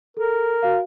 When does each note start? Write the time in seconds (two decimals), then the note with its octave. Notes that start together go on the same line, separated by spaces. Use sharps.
0.17 A4 A#4
0.62 F#4 F5